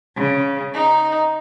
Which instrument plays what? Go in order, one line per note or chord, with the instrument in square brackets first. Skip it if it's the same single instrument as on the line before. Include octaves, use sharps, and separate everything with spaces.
[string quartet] C#3
D#4